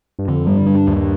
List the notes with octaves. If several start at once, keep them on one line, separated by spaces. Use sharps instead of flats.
G2
F2 D3
G2 G3
D4
D#2